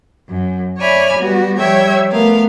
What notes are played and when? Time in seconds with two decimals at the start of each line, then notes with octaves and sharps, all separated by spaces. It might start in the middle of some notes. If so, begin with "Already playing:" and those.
0.29 F#2
0.79 C#5 D5 E5 G#5 B5 F6
1.17 G3 B3 F#4
1.58 F3 G3 C#5 E5 G5 G#6
2.11 A3 B3 A#4 F5